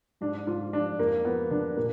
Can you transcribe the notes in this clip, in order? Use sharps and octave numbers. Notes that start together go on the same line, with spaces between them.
G#2 D4
G#2 F4
F3 D4
F2 A#3
F3 B3
D3 D4
A#2 A#3